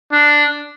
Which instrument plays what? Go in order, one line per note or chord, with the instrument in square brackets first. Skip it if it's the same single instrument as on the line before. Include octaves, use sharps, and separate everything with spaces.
[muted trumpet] D4